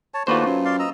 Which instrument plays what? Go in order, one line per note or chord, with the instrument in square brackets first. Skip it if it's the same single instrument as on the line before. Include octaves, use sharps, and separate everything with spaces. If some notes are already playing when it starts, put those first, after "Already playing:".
[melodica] C#5 A5
[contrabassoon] D#2 [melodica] A3 D4 F#4 [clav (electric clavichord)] F4 B4 C5
[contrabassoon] F#2 [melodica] F#3
[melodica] D5 F5 C6
D#5 A#5 E6